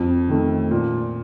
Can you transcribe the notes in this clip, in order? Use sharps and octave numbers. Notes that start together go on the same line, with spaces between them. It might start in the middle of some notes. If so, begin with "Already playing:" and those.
Already playing: F2
D#3 A3
A#2